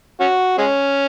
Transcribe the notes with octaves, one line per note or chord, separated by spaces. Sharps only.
C#4 F#4
G#3 C#4